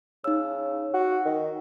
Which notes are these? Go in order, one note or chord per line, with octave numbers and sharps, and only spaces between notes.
C#3 D#4 E6
F#4
D#3